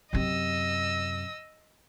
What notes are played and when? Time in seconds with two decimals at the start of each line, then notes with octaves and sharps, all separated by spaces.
0.13 F#2 C3 D#5 E6